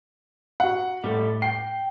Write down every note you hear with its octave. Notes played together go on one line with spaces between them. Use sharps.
F#4 F#5
A2 G3 A4
G5 C7